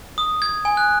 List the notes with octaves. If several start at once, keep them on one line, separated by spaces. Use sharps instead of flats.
D#6
G#6
G#5
F#6